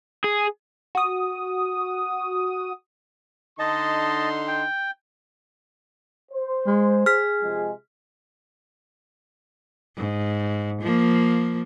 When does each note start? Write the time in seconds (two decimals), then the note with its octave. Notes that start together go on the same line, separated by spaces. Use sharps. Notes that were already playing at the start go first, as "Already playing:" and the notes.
0.24 G#4
0.95 F#4 D#6
3.59 D3 D#4 D#5 A5 C6
4.48 G5
6.32 C5
6.67 G#3
7.06 G#4 F6 B6
7.42 C3 F3 G#3
9.97 G#2
10.82 F3 A#3